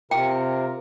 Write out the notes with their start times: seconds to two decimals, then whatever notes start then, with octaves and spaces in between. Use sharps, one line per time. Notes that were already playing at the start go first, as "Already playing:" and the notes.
0.11 C3 F4 A#4 G5